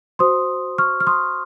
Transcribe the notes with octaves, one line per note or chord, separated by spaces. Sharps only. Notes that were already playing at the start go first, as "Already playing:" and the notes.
F#4 C5 C6 D#6
C#6 F6
F6
C6 D#6